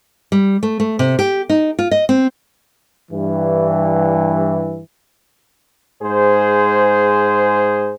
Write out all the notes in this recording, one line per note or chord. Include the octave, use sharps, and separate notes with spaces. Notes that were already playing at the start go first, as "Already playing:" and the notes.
G3
A3
A3
C3
G4
D#4
F4
D#5
C4
G2 E3
G#2 G#4 C5